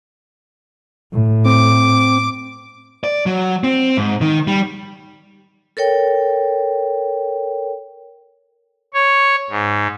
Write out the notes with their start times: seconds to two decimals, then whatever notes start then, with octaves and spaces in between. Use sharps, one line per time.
1.13 A2
1.45 C4 D6
3.04 D5
3.26 F#3
3.64 C4
3.97 G#2
4.21 D#3
4.47 G3
5.77 A4 A#4 C#5 G5
8.94 C#5
9.50 G#2